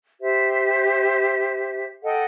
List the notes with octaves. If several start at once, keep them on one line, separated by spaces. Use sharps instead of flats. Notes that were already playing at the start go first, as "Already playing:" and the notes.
G4 C5 E5
A4 D#5 F#5 G5